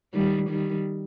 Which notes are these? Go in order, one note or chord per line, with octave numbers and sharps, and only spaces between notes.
D#3 G3
D#3 G3